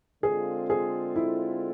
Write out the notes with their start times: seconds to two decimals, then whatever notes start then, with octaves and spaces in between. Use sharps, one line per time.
0.23 D3 G#3 C4 F4 G#4 A4
0.70 G#4
1.16 E4